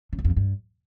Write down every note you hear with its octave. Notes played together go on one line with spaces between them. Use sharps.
C#3
F#2
F2
D3
G2